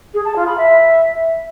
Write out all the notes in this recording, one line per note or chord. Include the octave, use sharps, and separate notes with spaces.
G#4
A5
F4
B5
E5